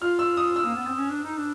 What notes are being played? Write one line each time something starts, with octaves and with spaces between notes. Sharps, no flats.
F4 F6
E6
D#6
E6
A#3
B3
C4
C#4
D4
D#4
D4